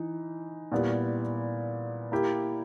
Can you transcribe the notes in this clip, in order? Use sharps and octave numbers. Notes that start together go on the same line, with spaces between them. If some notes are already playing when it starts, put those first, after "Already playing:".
Already playing: E3 D#4
A#2 G3 B3 E4
A#3 E4 G4